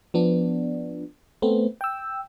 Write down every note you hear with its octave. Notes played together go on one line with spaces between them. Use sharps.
F3 B3 D4
A3 B3 C4
G5 E6